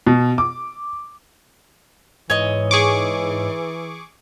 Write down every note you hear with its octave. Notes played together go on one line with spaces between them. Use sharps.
B2
D6
G#2 E3 C#5 D#5
G#4 C#6 D6